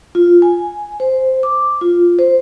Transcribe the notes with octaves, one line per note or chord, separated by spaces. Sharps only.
F4
G#5
C5
D6
F4
C5